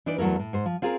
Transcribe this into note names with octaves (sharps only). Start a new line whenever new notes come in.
E3 D4 D#4 B4 D5
E2 F#3 A3 E4 A#4
A2
G#2 C5
F3
C4 F4 G#4 A#4